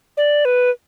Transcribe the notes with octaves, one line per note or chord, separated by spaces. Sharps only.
D5
B4